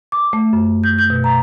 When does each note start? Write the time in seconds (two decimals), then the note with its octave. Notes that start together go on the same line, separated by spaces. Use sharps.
0.12 D6
0.33 A3
0.53 F#2
0.84 G6
0.99 G6
1.10 B2
1.24 A#5